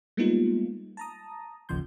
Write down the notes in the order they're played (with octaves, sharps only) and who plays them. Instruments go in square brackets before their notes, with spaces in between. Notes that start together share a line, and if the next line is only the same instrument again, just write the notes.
[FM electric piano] G3 G#3 A#3 B3 D#4 F4
A5 A#5 D#6
G#1 D#2 C#3 F3 C6 G6